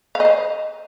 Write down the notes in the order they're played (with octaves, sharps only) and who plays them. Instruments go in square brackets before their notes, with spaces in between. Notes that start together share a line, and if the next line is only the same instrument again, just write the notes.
[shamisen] F5
D#5
C5